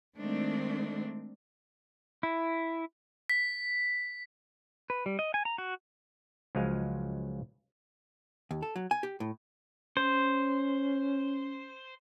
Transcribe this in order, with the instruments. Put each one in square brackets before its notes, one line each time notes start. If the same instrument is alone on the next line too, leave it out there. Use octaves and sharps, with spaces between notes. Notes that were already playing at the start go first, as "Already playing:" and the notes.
[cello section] D#3 G#3 A3 C4 D4
[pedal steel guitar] E4
[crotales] B6
[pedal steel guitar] B4
G3
D#5
G#5
A#5
F#4
[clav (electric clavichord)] C#2 F3 F#3 G#3 F5 G#5
[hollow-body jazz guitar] D#2
A4
F#3
G#5
G4
A2
[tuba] C#4 [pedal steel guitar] C5